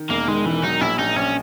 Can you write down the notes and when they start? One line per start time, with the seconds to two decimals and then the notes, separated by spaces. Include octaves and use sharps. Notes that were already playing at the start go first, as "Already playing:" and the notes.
Already playing: D#3
0.10 E1 A#3
0.28 D#3 G#3
0.45 E1 E3
0.63 F#3 D#4
0.81 A#1 E4
0.98 A#1 D#4
1.16 A#1 C#4